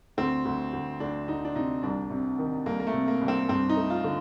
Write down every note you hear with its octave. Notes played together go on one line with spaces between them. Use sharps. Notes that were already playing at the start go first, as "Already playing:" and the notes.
D2 C4
D2
D2
D2 D4
D2 D#4
D4
C3 D#4
C2 D4
C3
D#3
C2 A#3
A#3
A3
C3
A#3
C2
C4
G2 C4
D#4
A3
F4
D3